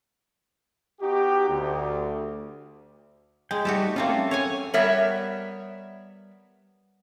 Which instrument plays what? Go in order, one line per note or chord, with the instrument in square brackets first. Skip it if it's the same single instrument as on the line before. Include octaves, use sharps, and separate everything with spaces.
[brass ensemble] B3 D#4 F#4 G4
D2
[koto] G#3 [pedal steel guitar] G5
[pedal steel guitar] G3 A3 D#4 [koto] F#4 G4 A4
[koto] A#3 C4 F4 [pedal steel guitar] C#4 A4 E5
[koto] C#5 F#5 G#5
[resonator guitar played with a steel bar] G3 B3 A#4 C#5 E5